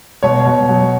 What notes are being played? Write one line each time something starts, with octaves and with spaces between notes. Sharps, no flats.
B2 C#5
B2
F#3